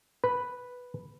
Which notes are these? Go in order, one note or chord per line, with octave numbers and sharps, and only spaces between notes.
B4